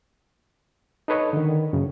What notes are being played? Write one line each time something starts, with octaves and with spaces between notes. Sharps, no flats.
D#4 A4 B4 C#5 D#5
D3 D#3
F#2 C#3